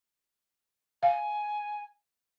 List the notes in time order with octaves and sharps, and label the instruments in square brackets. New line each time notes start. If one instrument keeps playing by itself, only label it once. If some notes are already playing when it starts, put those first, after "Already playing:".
[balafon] F5 [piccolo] G#5